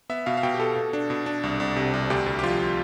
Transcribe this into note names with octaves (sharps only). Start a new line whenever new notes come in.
B3 E5
B2 F5
F5
B2 G5
G4
B2 A4
B2
D4
B2
D4
C2
C2
C3
C2
D2 G4
D2
G4
F3 F4